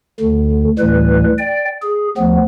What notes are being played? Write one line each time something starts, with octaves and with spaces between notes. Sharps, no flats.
D2 D3
D2 A2 E3 G3 B4
D5 G5
G#4
D2 F3 B3